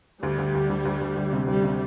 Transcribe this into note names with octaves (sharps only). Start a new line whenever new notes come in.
D2 G3
D2
D2
D2
D2
D2
D2
C3
D2 G3
C3